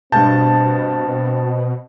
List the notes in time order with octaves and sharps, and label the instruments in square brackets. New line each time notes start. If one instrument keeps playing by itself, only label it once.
[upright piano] G2 G6 [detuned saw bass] B2 [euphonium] C4 [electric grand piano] A5